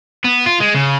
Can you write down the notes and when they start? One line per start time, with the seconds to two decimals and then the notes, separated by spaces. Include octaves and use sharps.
0.24 B3
0.46 F4
0.60 G#3
0.74 C#3